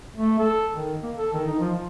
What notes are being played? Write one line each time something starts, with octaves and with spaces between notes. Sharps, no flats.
A3
A4
D#3
A#3
A4
D#3
D#4
F3
F3